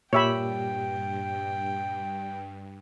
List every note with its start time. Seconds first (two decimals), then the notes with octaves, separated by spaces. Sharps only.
0.13 G2 A#2 G4 C#5 E5 G5 B5